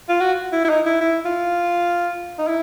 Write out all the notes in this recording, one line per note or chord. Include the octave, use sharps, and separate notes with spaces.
F4
F#4
E4
E4
D#4
E4
E4
F4
D#4
E4